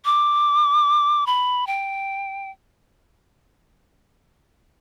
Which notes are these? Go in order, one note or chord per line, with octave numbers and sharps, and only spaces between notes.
D6
B5
G5